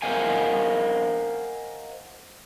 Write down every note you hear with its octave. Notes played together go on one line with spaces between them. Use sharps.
A#4 C5 D#5 F5 F#5 G#5